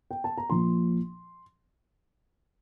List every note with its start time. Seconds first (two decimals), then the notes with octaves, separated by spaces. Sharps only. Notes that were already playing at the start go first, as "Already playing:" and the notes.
0.11 G5
0.24 A5
0.38 A#5
0.50 A#1 A#2 F3 C6